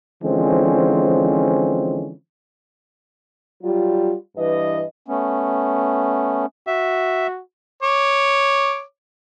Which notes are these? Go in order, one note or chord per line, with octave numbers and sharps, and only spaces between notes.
D3 E3 F3 G#3 C4 C#4
F#3 G3 F4
G2 E3 B4 D#5
A3 B3 C#4
F#4 E5
C#5 D6